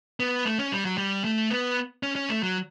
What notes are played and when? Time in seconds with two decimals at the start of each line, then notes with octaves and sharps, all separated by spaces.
0.20 B3
0.45 A3
0.59 C#4
0.72 G3
0.85 F#3
0.98 G3
1.24 A3
1.50 B3
2.03 C#4
2.16 C#4
2.30 A3
2.43 F#3